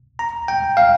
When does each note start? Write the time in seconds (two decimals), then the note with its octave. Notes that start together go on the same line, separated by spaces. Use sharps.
0.19 A#5
0.48 G5
0.77 F5